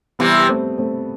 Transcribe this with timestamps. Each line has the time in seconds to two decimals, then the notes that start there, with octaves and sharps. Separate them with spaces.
0.19 C3 E3 G3 B3
0.49 A3 C4
0.78 A3 C4